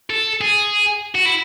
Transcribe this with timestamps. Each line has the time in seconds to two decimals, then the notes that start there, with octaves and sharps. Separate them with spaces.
0.10 A4
0.41 G#4
1.15 F#4
1.26 E4